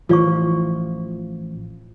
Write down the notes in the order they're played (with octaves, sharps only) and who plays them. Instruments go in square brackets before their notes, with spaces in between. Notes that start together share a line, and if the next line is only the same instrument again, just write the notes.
[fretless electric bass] A1 E3 F3 [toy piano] F4 D5 C#6